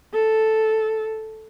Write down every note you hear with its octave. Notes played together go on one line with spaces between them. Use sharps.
A4